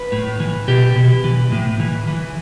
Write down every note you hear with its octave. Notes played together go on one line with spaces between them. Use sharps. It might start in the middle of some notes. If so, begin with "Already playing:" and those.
Already playing: B4
A2
E3
B2 G4
B2
E3
A2
E3
E3